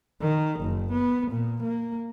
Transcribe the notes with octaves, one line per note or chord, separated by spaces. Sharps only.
D#3
F#1
B3
A#2
A#3